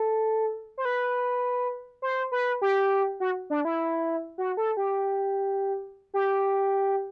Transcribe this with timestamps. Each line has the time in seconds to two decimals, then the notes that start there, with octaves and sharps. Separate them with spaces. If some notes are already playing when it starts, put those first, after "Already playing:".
Already playing: A4
0.78 C5
0.85 B4
2.02 C5
2.32 B4
2.62 G4
3.20 F#4
3.50 D4
3.65 E4
4.38 F#4
4.57 A4
4.77 G4
6.14 G4